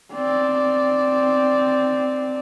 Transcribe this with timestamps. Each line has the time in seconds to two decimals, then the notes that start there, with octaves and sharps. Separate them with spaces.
0.13 C4 D5